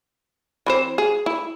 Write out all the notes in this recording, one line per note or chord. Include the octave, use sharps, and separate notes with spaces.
E3 C4 C5
G#4
E4